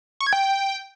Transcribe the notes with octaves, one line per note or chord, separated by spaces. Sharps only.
C#6
G#6
G5